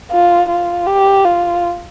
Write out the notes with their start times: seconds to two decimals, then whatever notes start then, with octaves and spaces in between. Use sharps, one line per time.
0.11 F4
0.49 F4
0.87 G4
1.25 F4